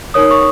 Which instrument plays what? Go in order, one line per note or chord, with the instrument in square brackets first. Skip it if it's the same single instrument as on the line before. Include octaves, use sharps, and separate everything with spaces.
[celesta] D#4 A#4 C#5 D#6
C#6